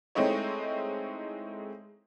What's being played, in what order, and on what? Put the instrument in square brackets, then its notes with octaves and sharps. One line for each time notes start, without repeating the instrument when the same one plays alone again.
[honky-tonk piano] G#3 A3 C4 D#4 E4 C#5